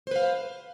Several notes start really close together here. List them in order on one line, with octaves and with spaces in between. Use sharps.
C5 B4 F5